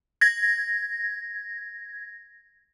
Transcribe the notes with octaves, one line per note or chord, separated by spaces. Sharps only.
G#6 A#6